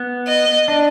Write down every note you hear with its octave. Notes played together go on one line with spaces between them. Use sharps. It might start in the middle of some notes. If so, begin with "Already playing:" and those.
Already playing: B3
D#5
D4